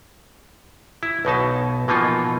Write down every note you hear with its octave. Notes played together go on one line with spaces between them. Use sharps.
E4
B1 B2 D#4 A5
B2 E3 F3 A#3 D#4 F4